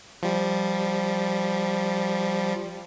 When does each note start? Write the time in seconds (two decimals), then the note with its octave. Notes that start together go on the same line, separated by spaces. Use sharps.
0.23 F3 G3